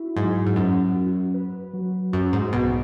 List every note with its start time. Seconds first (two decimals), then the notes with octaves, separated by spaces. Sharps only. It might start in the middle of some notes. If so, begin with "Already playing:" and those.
Already playing: E4 F#4
0.16 G#2 F#3
0.47 G#2
0.56 F#2 C#4
0.95 F#4
1.34 B4
1.73 F#3
2.13 F#2 F#4
2.33 G#2
2.53 B1 B2 B4